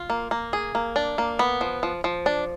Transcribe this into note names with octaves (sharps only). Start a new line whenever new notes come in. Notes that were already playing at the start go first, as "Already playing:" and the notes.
Already playing: F4
A#3
A#3
G#4
A#3
D4
A#3
B3
F3
F3
F3
D4